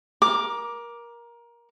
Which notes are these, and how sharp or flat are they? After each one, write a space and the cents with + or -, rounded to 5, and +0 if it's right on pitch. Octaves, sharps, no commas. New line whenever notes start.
A#4 +20 D6 +0